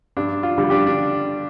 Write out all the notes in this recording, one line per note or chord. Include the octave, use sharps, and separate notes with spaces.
G2 D4
F4
D3 G3
D4 G4
D4